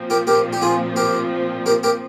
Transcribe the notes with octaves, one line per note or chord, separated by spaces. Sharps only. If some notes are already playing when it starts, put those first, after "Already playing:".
Already playing: A#2 F3 C4
G4 A#4
G4 A#4
G4
F4 G#4
G4 A#4
G4 A#4
G4 A#4